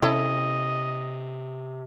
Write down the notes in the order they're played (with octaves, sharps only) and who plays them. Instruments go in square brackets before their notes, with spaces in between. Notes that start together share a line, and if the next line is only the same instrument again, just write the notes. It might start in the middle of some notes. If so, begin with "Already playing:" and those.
[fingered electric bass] C3 C#4 [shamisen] E4 A4 C#5 [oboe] D#5